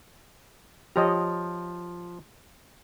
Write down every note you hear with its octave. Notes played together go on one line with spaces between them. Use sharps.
F3 G4 C#5 D#5 A#5